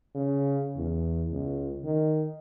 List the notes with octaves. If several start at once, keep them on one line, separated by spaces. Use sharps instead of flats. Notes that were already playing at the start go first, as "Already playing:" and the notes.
C#3
E2
C#2
D#3